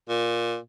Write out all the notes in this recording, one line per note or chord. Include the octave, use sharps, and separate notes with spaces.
A#2